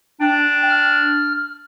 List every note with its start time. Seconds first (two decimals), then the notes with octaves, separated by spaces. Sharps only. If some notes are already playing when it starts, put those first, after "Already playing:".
0.20 D4 G5
0.70 F6